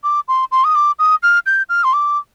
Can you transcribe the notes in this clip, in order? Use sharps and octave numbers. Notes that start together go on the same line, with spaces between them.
D6
C6
C6
D#6
D6
D#6
F6
G6
F6
C6
D6